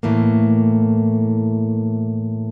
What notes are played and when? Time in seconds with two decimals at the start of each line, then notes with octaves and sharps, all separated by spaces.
0.03 A2 E3 A3 A#3